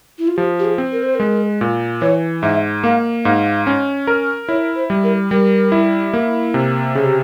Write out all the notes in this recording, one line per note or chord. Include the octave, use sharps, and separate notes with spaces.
E4
F4
F3 G4
G4
G#4
C4
A#4
C5
G#3 A#4
A#2
E3 C#5
G#2 E5
A#3 F5
G#2 F5
C#4
A#4
E4 C#5
C5
G3
A#4
G3 A#4
E4
A#3
C3
C#3 G#4
G4